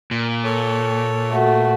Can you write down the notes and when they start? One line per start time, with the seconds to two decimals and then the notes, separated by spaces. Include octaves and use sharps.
0.11 A#2
0.44 A4 C#5
1.31 A3 F#4